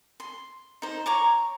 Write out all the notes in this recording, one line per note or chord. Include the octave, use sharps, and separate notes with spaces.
C6
D#4 C5
C#5 A#5 C#6 D6